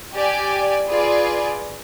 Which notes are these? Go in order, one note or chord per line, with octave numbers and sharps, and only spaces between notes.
G4 D5 G#5
F4 G#4 B4 D5